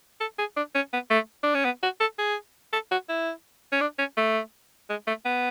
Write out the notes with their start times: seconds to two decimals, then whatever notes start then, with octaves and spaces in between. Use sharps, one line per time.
0.21 A4
0.39 G#4
0.56 D4
0.75 C#4
0.93 B3
1.10 A3
1.43 D4
1.55 C#4
1.65 B3
1.83 F#4
2.00 A4
2.18 G#4
2.73 A4
2.91 F#4
3.09 E4
3.72 C#4
3.81 D4
3.99 C#4
4.17 A3
4.90 G#3
5.07 A3
5.25 B3